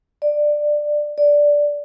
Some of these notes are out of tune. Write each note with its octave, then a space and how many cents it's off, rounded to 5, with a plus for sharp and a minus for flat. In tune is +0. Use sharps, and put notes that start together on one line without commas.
D5 +15
D5 -5